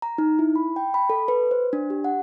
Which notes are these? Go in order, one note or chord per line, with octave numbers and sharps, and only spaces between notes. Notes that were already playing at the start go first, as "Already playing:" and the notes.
A#5
D#4
E4
B5
G5
B5
A4
B4
C5
D4
G4
F#5